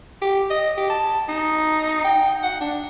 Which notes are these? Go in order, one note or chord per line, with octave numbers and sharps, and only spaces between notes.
G4
D#5
G4
A5
D#4
G5
F#5
D4